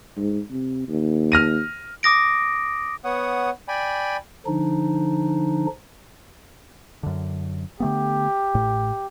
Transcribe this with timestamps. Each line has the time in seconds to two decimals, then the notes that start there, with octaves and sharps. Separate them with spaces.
0.17 G#2
0.51 C3
0.88 D#2
1.32 F6 A#6 D#7
2.03 D6 D#6 A#6 D7
3.05 B3 C#5 F#5 D#6
3.68 D5 G5 G#5 B5
4.46 D3 F3 D4 D#4
7.03 F#2 D3
7.80 D3 A3 B3 G4
8.54 A1 A2